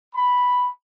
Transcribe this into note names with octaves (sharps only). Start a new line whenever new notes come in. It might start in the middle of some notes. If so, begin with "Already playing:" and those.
B5